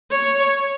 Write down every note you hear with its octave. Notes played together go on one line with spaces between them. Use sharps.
C#5